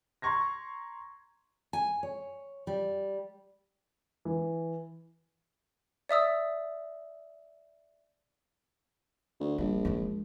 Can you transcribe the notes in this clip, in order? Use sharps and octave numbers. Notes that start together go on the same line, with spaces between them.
A#5 C6 C#6 G#6 A#6
G#5
C#5
G3
E3
D5 E5 D#6 E6
D2
A#1 G3
F3 G#3